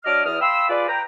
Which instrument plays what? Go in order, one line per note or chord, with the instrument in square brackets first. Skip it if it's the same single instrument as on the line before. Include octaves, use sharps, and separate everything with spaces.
[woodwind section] F#3 D4 D#5 D6 F6
E2 D#6 F6
F5 G5 B5 C6 E6
F4 G#4 B4 D5
B4 G5 A#5